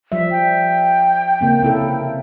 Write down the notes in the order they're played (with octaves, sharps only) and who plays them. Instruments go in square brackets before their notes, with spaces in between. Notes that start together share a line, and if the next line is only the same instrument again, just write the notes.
[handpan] F3 G3 E5
[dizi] G5
[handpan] C#3 A#3 C4
C3 E4 A4